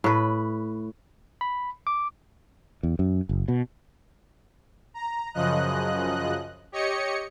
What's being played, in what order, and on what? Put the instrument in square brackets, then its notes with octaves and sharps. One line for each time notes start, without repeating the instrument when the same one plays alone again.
[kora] A2 B4
[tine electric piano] B5
D6
[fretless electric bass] E2
F#2
F#1
B2
[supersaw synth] A#5
F#2 C#3 F3 D#5 F#6
G4 C#5 D#5 C#7